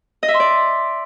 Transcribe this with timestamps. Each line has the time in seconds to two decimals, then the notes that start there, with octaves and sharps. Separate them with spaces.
0.23 D#5
0.28 E5
0.34 C6
0.40 D5